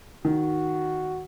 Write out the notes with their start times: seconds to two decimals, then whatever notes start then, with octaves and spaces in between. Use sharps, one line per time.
0.25 D#3 F#4